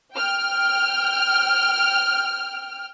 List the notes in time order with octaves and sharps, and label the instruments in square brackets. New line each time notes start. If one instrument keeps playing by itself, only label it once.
[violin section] G5 F6